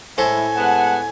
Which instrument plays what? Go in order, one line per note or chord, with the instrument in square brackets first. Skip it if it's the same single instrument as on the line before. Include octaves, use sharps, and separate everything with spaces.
[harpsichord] A2 A4 C5 [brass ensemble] G#3 E4 [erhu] G#5
[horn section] G#3 B3 A5 [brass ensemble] F#5